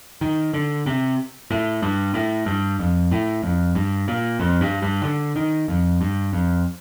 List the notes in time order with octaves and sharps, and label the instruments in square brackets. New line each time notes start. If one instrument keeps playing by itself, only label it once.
[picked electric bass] D#3
D3
C3
A2
G2
A2
G2
F2
A2
F2
G2
A#2
F2
G2
G2
D3
D#3
F2
G2
F2